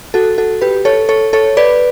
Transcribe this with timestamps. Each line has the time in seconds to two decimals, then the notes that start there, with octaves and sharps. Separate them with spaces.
0.14 F#4 A4
0.38 F#4 A4
0.61 G4 B4
0.85 A4 C#5
1.09 A4 C#5
1.33 A4 C#5
1.57 B4 D5